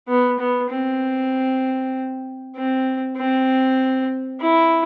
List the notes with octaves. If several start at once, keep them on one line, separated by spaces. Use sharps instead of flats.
B3
B3
C4
C4
C4
E4